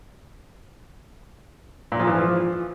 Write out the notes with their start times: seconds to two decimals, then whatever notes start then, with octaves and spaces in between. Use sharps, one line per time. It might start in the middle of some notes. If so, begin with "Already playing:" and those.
1.92 A#2
1.99 F3
2.07 E3
2.15 F3